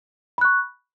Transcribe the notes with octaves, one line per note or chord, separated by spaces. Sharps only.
B5 C#6 F#6